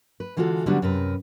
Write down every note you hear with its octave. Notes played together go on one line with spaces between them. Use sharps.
B4
D3 E3 G#3 F4 F#4 A4
D3 F#3 G3 B3 C#4 D4
F#2 C3 A#4 B4